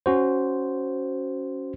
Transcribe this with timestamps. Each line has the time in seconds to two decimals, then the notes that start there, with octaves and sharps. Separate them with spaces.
0.06 C#4 F#4 C5